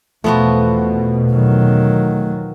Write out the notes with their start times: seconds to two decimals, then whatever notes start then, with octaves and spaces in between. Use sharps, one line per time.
0.24 E2 B2 F3 A3 B3 F#4
1.32 D#3 F#3